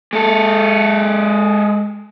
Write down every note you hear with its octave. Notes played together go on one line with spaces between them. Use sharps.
G#3 A4